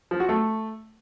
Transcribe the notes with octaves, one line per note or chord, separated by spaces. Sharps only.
F3
F#4
A3